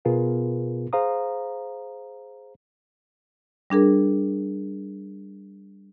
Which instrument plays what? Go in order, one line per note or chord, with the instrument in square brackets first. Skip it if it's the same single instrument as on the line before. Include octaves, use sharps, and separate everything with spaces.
[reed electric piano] B2 B3 F4 G#4 A#4 B4
G#4 C5 F5 A#5 D#6
[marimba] G3 D4 G#4 A#4